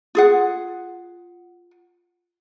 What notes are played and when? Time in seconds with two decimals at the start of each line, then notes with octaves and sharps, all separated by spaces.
0.15 F4 G#4 F#5